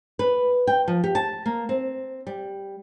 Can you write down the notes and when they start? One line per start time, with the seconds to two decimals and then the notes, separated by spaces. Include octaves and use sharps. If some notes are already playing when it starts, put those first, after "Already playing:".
0.19 B4
0.67 G5
0.88 F3
1.04 G4
1.15 A5
1.46 A#3
1.69 C4
2.27 G3